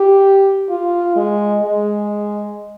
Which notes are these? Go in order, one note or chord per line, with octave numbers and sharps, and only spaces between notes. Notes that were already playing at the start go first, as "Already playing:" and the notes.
Already playing: G4
F4
G#3
G#3